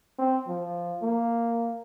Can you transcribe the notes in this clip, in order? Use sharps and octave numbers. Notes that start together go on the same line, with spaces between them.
C4
F3
A#3